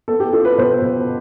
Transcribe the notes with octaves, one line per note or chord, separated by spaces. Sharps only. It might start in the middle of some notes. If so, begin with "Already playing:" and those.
B3 A4
G4
F4 A4
B4
B2 C5
B2